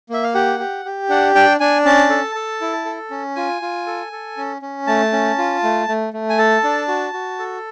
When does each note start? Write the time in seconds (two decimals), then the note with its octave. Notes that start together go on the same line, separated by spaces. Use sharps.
0.09 A#3 E5
0.24 F5
0.34 G4 F#5
0.60 G4
0.85 G4
1.09 D4 F#5
1.35 D4 G5
1.60 D4 G#5
1.85 C#4 A5
2.10 A4
2.35 A4
2.61 E4
2.85 A4
3.11 C#4
3.36 F4 G#5
3.62 F4
3.87 A4
4.12 A4
4.37 C#4
4.62 C#4
4.87 A3 A5
5.13 C#4
5.38 F4
5.63 A3
5.88 A3
6.13 A3
6.30 G#5
6.38 A4 A5
6.64 D4
6.88 F#4
7.13 F#4
7.39 A4